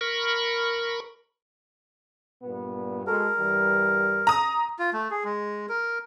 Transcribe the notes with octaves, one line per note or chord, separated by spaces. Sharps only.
A#4 B5 C#6
G2 A#2 B3
G#3 F#4 A4 A#4
G2 E3 G3
A#5 D#6
F4
A3
G#4
G#3
A#4